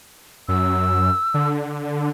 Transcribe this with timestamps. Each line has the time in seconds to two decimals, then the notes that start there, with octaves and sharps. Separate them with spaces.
0.48 F#2 E6
1.34 D3